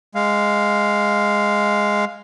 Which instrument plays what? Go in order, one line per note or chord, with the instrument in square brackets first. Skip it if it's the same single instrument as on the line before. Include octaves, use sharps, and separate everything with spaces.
[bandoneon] G#3 F5